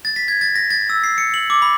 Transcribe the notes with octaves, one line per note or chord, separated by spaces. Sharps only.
A6
B6
G#6
A6
A#6
A6
E6
C7
C#7
F#7
D6
B5